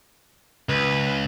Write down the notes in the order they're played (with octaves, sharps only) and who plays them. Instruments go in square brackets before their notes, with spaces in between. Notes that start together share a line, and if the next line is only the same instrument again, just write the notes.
[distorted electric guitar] C#2 [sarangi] B4